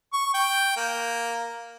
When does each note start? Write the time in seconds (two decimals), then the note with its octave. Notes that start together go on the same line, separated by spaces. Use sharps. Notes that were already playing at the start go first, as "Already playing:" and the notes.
0.13 C#6
0.34 G5
0.77 A#3